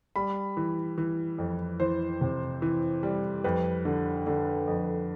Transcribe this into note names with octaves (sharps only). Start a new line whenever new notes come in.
G3 B5
E3
E3
F2
E3 C5
C3
E3
G3
F2 B4
D3
D3
F2